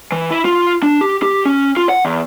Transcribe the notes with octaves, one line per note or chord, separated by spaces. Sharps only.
E3
E4
F4
D4
G4
G4
C#4
F4
F#5
E2